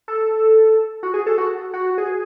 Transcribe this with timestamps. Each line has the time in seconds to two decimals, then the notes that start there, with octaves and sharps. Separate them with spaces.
0.08 A4
1.03 F#4
1.14 G#4
1.26 A4
1.38 F#4
1.73 F#4
1.98 G#4